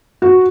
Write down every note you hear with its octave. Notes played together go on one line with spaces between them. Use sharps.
F#4